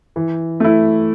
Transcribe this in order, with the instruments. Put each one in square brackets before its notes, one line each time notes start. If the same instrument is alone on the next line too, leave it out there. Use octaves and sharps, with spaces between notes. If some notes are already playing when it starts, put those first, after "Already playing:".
[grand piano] E3
A3 E4